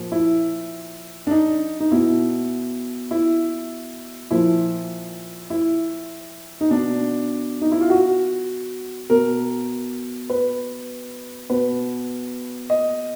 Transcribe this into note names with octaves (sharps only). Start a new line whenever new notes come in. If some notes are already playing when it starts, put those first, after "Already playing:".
Already playing: A#2 F3
E4
D4
D#4
D#4
B2 E4
E4
A#2 F3 E4
E4
D#4
B2 D4
D#4
E4
F4
F#4
B2 A#4
B4
B2 B4
D#5